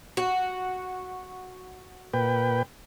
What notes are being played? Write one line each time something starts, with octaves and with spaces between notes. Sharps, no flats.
F#4
A#2 B4 G5